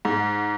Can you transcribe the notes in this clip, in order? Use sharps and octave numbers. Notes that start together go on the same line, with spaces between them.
G#2